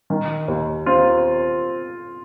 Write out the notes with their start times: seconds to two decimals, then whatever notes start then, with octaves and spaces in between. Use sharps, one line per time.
0.10 D#3
0.48 D#2
0.86 C4 F4